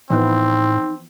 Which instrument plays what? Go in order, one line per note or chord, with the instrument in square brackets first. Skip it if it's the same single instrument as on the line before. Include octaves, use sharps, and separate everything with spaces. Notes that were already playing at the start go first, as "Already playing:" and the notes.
[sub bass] A2 [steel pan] E3 F3 B3 [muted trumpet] C4 [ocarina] D#4